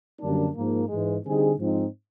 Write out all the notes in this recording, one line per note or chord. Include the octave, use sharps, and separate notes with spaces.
F#2 D3 G3 A#3 D4
G#2 F3 A#3
G#2 E3 G#3
D3 G3 C4 D#4 G#4
G#2 F3 G#3 C4 D#4